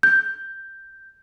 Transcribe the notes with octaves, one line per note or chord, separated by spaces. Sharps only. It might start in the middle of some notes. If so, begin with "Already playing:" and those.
G6